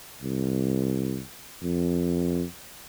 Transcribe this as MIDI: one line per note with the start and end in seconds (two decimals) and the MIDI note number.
0.22 1.22 36
1.62 2.45 41